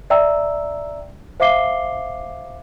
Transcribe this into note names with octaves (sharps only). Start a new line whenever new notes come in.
D5 E5 G5 A#5 E6
C5 E5 F5 D6 C7 G7